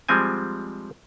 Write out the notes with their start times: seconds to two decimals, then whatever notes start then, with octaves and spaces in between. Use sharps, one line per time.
0.09 F3 G3 G#3 C4 G#5